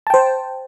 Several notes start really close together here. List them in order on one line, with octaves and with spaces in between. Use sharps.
A5 G5 C5